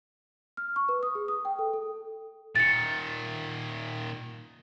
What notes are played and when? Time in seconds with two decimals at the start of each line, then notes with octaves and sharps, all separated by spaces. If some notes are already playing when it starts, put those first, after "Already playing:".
0.57 F6
0.76 C#6
0.89 B4
1.03 D#6
1.15 G#4
1.28 D#6
1.45 G5
1.59 A4
1.74 A4
2.56 A#2 D#3 A6 C#7